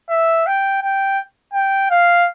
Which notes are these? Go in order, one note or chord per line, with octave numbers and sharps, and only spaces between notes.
E5
G5
G5
G5
F5